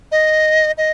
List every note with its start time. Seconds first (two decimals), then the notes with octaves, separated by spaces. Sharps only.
0.12 D#5
0.78 D#5